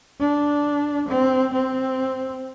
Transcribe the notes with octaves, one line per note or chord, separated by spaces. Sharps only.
D4
C4
C4